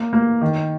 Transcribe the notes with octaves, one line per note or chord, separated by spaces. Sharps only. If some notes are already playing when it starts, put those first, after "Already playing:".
Already playing: A#3
A#3
D#3